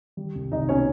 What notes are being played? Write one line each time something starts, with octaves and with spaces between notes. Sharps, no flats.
G3
C2
C2 D#4 D#5
B2 C#4 C#5